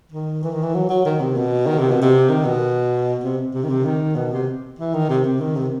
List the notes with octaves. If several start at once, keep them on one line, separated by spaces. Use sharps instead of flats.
D#3
E3
D#3
E3
F#3
F#3
D#3
C3
B2
D#3
C3
B2
C3
D#3
B2
C3
C3
D#3
C3
D#3
B2
C3
E3
D#3
C3
C3
D#3
C3